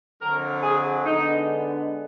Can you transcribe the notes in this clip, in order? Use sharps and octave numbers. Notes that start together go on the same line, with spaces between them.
F2 D3 F#3 A#4
G#4
D3 G#3 B3 D4 D#4